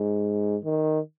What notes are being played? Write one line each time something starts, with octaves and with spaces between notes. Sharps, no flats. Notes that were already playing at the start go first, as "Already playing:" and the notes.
Already playing: G#2
D#3